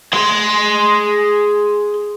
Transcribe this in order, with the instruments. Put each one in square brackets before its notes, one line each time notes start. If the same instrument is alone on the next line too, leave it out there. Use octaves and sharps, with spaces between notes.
[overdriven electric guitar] G#4 C6